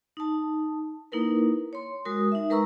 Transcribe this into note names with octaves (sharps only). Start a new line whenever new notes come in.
D#4 A5
A#3 D#4 E4 A#4 B4
C#5 C6
G#3 F#4 A#4 D#6
D#4 E5
G#3 A#4 B4 A#5 C#6 E6